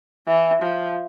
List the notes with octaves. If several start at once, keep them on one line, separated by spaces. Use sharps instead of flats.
E3
F3